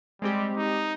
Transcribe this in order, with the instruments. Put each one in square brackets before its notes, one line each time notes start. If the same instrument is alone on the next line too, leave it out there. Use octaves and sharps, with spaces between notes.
[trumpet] G3 [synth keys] G#3 C4 G4
[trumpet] D#4